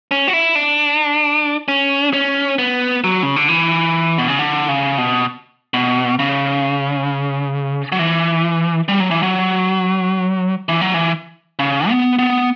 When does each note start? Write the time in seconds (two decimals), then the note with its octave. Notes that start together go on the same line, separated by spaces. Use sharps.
0.11 C#4
0.28 F#4
0.33 E4
0.55 D4
1.68 C#4
2.13 C#4
2.58 B3
3.04 F#3
3.23 C#3
3.36 D3
3.49 E3
4.18 B2
4.28 C#3
4.39 D3
4.69 C#3
4.98 B2
5.74 B2
6.19 C#3
7.92 F#3
7.99 E3
8.88 G3
9.00 F#3
9.11 E3
9.23 F#3
10.69 E3
10.81 F#3
10.94 E3
11.59 C#3
11.89 B3
12.19 B3